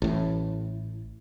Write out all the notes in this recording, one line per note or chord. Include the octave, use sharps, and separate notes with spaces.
A1 A2